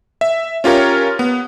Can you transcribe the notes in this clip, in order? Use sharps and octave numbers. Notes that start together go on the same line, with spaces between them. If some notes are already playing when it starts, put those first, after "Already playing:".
E5
C#4 F4 G4 A#4 C#5
B3